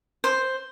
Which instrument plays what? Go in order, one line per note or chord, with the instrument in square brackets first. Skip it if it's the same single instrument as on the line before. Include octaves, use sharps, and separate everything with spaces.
[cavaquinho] C5